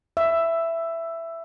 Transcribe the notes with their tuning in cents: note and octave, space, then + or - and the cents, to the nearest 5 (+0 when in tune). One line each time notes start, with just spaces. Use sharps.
E5 +10